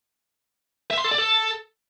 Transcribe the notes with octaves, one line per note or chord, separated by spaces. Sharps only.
E5
C6
A4
D5
A4